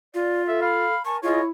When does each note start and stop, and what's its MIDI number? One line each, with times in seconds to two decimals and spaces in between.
0.14 0.86 65
0.14 0.43 74
0.48 0.93 69
0.48 0.57 76
0.62 0.99 77
0.62 1.05 83
1.05 1.18 70
1.05 1.18 80
1.05 1.18 81
1.05 1.17 85
1.23 1.49 64
1.23 1.40 65
1.23 1.40 68
1.23 1.43 73
1.23 1.40 75